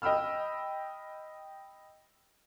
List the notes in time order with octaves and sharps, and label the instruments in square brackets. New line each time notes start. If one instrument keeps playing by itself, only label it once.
[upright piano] D#5 G5 B5 E6 F6